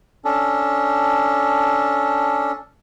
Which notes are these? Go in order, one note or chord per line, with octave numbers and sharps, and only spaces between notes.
C#4 D4 A4